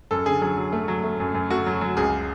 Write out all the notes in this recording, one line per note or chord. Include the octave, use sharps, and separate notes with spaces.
F#2 A4
D3 G#4
F#3 G#4
F#3
A3
F#3
A3
F#2
F#2
A3 F#4
F#3
F#3
C#2 G#4